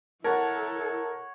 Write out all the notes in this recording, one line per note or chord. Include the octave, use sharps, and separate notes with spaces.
E4 A4 A#4 C#5 F#5 A5